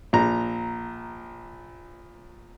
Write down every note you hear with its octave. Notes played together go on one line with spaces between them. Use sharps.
A#1 A#5